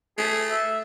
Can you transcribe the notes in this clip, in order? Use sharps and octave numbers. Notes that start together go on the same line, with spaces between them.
A3 G#4
E5